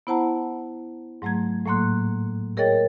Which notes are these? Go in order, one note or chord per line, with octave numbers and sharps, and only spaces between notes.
B3 E4 C5 F#5 A5 A#5
G#2 F#3 A3 A#5 G#6
A2 F#3 A#3 C6 F#6
G#4 A#4 C#5 D#5 G5 A6